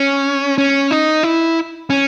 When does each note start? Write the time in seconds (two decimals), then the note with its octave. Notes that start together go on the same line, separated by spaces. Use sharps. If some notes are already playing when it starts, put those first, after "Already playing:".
Already playing: C#4
0.58 C#4
0.91 D#4
1.23 E4
1.90 C#4